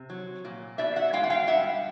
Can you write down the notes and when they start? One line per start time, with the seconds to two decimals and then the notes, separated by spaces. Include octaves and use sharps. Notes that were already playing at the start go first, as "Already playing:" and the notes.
Already playing: C3
0.10 F#3
0.45 A#2
0.78 B2 D5 E5
0.96 E5 F#5
1.13 G#3 F5 G5
1.23 F#5
1.30 F5 G5
1.47 G2 E5 F#5